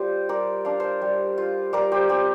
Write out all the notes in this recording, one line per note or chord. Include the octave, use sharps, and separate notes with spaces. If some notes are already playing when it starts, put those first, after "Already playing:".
Already playing: G3 F4 G4 C5
G3 A#4 D5
D4 F5
C5 F5
G3
F4
G3 A#4 D5
G4 C5
C4 G4